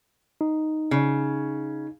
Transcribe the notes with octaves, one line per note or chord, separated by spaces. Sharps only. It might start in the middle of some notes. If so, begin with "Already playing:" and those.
D#4
C#3